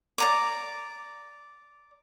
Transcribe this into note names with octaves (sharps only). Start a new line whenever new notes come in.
D5 A#5 D6